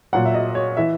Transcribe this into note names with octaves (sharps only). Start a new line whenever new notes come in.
A#2 F#3 F#5
E5
D#5
C#5
E3 E5